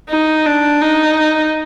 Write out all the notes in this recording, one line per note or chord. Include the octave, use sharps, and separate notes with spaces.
D#4
D4
D#4